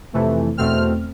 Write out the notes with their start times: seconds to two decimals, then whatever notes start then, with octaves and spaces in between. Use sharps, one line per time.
0.13 F2 C3 E3 A3
0.57 E2 B2 A3 C4 F6